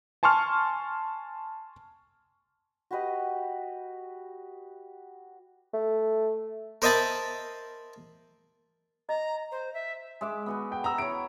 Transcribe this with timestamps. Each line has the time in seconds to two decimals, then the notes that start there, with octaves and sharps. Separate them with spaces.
0.23 G#5 A5 C6 C#6 F6
2.91 F#4 G4 B4 D#5
5.73 A3
6.82 A#4 C5 D#5 E5 A5 B5
9.09 D#5 A#5
9.52 C5
9.74 E5
10.21 G#3 E5 D6
10.46 B3 F#4 G#5
10.72 G5
10.84 A#5 E6
10.98 E4 C#5 D7